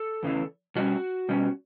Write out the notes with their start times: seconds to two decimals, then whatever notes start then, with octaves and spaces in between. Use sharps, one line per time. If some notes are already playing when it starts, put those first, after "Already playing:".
Already playing: A4
0.23 E2 C#3 E3
0.76 B2 G3 C#4 F#4
1.29 B2 G3 C#4